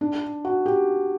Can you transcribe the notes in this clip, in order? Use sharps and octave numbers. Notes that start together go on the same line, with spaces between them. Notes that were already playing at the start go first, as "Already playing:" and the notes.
D4
F#4
G4